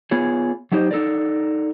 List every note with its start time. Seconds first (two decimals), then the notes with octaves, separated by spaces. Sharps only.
0.11 B3 F4 G#4 C#5
0.72 F#3 A3 D#4 G4 C5 D#5
0.91 D#4 A4 A#4 D5